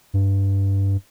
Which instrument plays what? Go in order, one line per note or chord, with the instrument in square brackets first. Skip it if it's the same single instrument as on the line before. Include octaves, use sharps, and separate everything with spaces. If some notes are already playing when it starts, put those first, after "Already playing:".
[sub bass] G2